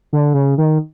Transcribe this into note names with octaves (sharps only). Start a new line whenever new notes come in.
D3
C#3
D#3